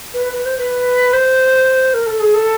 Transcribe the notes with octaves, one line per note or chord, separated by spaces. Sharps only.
B4
B4
C5
B4
C5
A#4
A4
G#4
A4